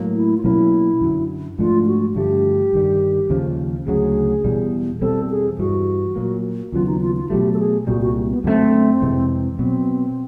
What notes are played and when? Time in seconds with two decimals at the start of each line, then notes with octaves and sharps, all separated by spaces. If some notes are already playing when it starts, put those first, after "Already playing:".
Already playing: A2 F#3 A#3
0.15 E4
0.37 F4
0.43 B2 F#3 A#3 C#4 E4
1.01 F#2 D3 F#3
1.59 G#2 F3 A3 D4 F4
1.86 F#4
2.15 G2 D3 F3 A3 G4
2.73 G2 D#3 G3
3.30 D#2 C#3 F3
3.87 D2 C#3 F#3 G#4
4.44 E2 B2 G3
5.01 E2 B2 G3 C4 A4
5.30 G#4
5.58 G2 E3 G3 F#4
6.16 A#2 F#3 A#3
6.72 D#2 C#3 F#3 B3 F4
6.87 D#4
7.01 F4
7.16 F4
7.29 B2 F#3 A3 G4
7.54 A4
7.59 G#4
7.87 C2 A#2 G3 F#4
8.01 F#4
8.30 B3
8.44 F#2 D3 F#3 A3 C4
9.02 F2 C3 E3 G#3
9.58 B2 F#3 B3 C4